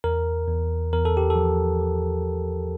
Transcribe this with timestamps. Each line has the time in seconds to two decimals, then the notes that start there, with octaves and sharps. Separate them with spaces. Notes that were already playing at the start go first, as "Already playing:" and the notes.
0.04 E2 A#4
0.48 E2
0.92 E2 A#4
1.05 A4
1.17 G4
1.30 A4
1.36 F3
1.80 F3
2.23 E2